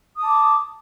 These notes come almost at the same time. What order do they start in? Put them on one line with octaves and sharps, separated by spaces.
D#6 A5 D6